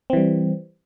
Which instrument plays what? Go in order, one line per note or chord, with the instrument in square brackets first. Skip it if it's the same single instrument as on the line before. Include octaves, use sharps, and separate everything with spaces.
[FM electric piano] C4
E3
G3